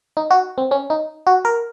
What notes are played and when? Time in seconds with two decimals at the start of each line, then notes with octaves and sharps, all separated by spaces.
0.17 D#4
0.31 F#4
0.58 C4
0.71 C#4
0.90 D#4
1.27 F#4
1.45 A#4